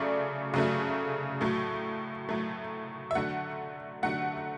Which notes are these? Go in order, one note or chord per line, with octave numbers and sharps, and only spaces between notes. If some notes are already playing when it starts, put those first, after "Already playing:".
Already playing: C#3 F#3 A3 D5
C#3 F#3 A3
A2 F#3 A3
A2 F#3 A3
E5
D3 F#3 A3 F#5
D3 F#3 A3 F#5